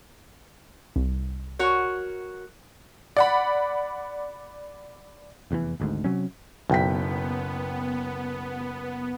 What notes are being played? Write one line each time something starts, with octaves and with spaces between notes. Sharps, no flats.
C2
F#4 A#4 C#5
D5 F#5 B5
F1 E2 C3 E3
G#1 D2 G#2
C3 F#3 C#4
F#1 B1 B3 G5 B6